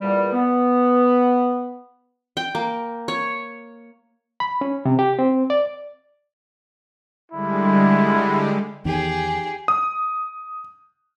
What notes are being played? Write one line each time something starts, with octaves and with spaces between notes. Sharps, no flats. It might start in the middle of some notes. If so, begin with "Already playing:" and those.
E2 A#2 G3
B3
G5
A#3
C#5
B5
C#4
C3
G4
C4
D5
D3 G3 G#3 E4
E2 D#3 G4 G#4
D#6